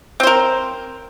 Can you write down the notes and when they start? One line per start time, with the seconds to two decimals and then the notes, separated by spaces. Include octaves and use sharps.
0.20 C4
0.23 C5
0.27 A#4